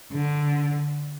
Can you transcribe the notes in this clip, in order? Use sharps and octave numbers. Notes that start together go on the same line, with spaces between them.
D3